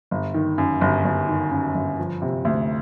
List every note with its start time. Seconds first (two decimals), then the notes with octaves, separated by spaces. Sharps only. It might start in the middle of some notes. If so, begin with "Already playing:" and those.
0.11 G1
0.34 D#3
0.58 F#2
0.81 G1
1.05 G1
1.28 D#3
1.51 F#2
1.75 G1
1.98 F3
2.22 C3
2.45 D2